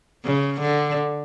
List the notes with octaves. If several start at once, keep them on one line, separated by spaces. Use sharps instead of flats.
C#3
D3